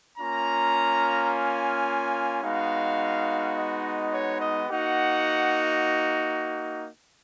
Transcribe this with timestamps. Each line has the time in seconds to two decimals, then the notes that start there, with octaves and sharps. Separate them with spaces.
0.18 A#3 C#4 F4 A#5
1.30 G#5
2.42 G#3 B3 D#4 F#4 F5
3.54 D#5
4.11 C#5
4.38 D#5
4.67 A#3 D#4 F#4 F#5